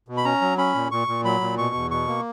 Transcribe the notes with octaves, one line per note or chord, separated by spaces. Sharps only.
B2
B5
C#4 A#5
F#3
C#4 B5
A#2
A#2 C#6
A#2
F#3 B5
A#2
B2 C#6
E2
B2 C#6
A#3